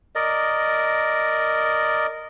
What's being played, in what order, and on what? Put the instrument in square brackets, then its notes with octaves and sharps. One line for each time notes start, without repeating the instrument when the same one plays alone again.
[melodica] A#4 D5 D#5